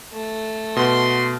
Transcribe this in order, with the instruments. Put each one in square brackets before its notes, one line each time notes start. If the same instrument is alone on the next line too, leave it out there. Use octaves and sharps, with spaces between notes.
[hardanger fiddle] A3
[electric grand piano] B2 [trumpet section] F#4 C6